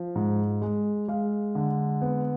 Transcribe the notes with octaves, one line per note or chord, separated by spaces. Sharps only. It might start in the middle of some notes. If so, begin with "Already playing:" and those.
Already playing: F3
G#2
G#3
G#3 F5
D3
B3